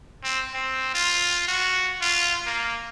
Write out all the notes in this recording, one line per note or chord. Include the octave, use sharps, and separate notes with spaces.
C4
C4
F4
F#4
F4
A#3